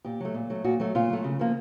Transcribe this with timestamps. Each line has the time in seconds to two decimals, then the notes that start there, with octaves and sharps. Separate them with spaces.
0.04 A#2 G4
0.20 F#3 A3
0.34 A#2
0.50 F#3 A3
0.64 A#2 F#4
0.80 F#3 A3
0.95 A#2 F4
1.10 F#3 A3
1.24 C#3
1.39 F3 A#3